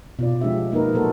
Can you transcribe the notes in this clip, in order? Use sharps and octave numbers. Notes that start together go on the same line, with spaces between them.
B2 F4 D5
F3 G#3 C#4 D4 G4 E5
A#3 D#4 F#4 A#4 B4
A#2 F#3 A#3 F#4 A4 C5